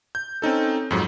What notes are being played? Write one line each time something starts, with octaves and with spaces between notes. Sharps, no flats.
G6
C4 C#4 D#4 A4
F2 G#2 F#3